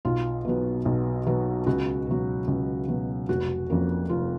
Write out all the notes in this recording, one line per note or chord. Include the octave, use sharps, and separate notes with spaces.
B1 F4
B2 F#3 B3
B1
B2 F#3 B3
C#2 F#4
B2 F#3
C#2
B2 F#3
F1 F#4
F2 F3 A#3 C#4
F1 F4